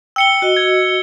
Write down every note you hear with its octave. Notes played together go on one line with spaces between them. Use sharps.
G5 E6 C#7 G7
F#4 D#5
G#6